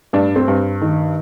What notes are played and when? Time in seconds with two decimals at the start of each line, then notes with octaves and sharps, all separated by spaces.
0.13 G2 D4
0.36 C4
0.48 G2
0.81 D#3